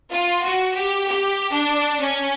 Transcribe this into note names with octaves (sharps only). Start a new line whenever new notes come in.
F4
F#4
G4
G4
D4
C#4